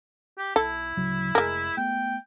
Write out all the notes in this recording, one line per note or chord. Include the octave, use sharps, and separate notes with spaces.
G4
B1 E4 A4
D1 C#3 F#3
F1 G#3 A#4
A3 B3 G5